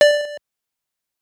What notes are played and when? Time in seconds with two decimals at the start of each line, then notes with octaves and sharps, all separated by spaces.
0.01 D5